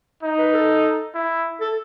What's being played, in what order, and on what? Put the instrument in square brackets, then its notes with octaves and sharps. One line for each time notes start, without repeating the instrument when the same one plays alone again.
[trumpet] D#4
[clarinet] B4
A4
[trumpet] E4
[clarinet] A4